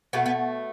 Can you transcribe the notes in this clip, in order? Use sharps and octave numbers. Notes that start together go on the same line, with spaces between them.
B2 A3 B3
B3